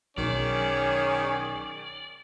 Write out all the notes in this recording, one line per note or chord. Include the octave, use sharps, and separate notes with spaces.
B1 D#3 C#4 G#4 C#5 D5